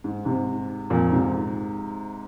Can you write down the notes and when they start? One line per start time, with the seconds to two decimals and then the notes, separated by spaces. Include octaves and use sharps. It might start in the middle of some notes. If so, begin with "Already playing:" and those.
0.04 G#2
0.25 G#2 C3
0.90 F2 A#2
1.12 G#2 C3